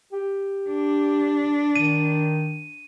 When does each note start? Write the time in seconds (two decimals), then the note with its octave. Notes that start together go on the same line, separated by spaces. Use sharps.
0.12 G4
0.70 D4
1.76 D#3 D#7